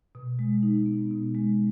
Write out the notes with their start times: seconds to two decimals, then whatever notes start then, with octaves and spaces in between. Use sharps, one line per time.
0.15 B2
0.39 G#3
0.63 D#4
0.86 B3
1.11 B2
1.35 G#3